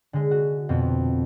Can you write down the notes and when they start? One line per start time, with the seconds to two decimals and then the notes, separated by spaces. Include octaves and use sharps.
0.13 D3 G#3
0.31 F#4
0.69 F2 B2 B3 C4